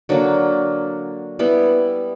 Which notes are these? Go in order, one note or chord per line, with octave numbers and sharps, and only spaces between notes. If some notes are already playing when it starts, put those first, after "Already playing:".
D3 F#3 A#3
G3 B3 E4